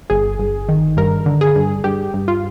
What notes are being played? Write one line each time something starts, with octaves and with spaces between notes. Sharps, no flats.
G1 G#4
G1
D#3
G2 A#4
D3
G#4
G2
G2 G4
G2
F4